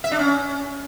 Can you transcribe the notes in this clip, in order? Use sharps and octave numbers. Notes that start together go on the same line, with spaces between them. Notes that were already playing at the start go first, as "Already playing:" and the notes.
E5
D4
C#4